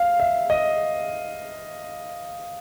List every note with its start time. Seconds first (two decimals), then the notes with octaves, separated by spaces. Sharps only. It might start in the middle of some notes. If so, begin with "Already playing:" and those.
Already playing: F5
0.20 E5
0.50 D#5